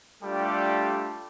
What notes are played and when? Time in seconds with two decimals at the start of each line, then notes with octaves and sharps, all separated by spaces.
0.23 G3 A3 D4 F4 G4 A4